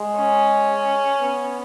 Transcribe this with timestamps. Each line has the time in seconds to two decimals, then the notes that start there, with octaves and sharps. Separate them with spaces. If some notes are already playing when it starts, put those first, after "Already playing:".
Already playing: G#3
0.18 C#4
1.21 B3